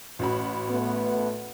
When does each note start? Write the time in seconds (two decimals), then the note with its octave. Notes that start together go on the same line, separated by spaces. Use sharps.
0.19 A1 F#4 B5
0.69 A3 B3